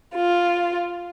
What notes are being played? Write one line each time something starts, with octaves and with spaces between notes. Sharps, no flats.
F4